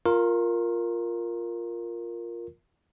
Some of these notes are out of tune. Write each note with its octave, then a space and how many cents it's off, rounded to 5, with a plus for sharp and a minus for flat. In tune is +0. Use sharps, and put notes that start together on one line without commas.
F4 +0 A#4 +0 C6 +45